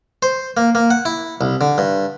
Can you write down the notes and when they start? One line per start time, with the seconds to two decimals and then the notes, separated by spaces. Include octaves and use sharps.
0.23 C5
0.57 A#3
0.75 A#3
0.91 F#5
1.05 E4
1.41 C2
1.61 D3
1.78 G2